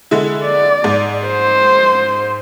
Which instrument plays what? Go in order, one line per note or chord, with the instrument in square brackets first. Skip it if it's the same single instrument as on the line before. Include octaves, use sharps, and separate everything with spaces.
[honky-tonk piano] D3 G#3 E4
[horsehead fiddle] D5
[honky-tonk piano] G#2
[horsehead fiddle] C5